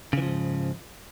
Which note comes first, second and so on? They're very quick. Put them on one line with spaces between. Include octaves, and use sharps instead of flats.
C#3 E3 F3 G#2